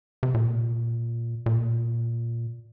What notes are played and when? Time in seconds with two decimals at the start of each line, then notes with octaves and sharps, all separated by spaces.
0.23 C3
0.34 A#2
1.46 A#2